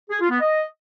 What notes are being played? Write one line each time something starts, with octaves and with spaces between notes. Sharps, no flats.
G#4
F4
B3
D#5